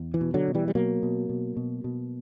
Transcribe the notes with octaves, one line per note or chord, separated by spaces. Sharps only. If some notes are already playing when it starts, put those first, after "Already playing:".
Already playing: E2
E3
B2
D3 F#3
B2
E3 G3
G3
B2 F#3 A#3
B2
B2
B2
B2